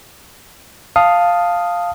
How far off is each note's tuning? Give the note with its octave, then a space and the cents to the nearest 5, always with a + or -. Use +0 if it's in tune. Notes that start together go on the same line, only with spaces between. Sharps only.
F5 +0 A5 +0 D#6 +0